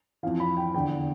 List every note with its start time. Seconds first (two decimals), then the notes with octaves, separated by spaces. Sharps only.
0.23 F2 E3 F5
0.40 B5
0.57 G5
0.74 E2 D3 G5